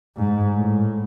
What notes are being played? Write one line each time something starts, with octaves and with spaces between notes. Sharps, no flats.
G#2
A2